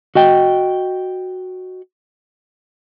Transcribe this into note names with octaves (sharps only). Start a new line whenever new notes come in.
F#4 D#5 G5